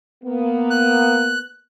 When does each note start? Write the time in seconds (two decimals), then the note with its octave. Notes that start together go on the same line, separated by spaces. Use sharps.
0.24 A#3 B3
0.70 F#6